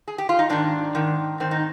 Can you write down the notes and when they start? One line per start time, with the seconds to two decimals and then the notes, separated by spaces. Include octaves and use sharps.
0.08 G#4
0.18 G4
0.29 F4
0.39 D#4
0.49 G#2 D#3 D4
0.95 G#2 D#3
1.40 G#2 D#3 C4
1.51 D#4